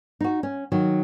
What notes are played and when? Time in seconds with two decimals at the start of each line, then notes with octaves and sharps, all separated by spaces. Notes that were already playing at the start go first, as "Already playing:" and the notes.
0.21 D#4 F#4
0.43 C#4
0.72 D#3 F#3